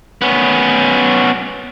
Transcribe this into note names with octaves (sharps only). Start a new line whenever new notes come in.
B3 C#4